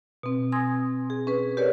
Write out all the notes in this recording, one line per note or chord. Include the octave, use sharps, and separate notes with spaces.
B2 C4
G#5 C6 D#6 E6 G#6 A#6
G#4
C#4 G#4 B4
G4 A#4 B4 C#5 D5